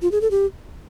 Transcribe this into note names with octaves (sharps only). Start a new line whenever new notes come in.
F4
G#4
A4
G4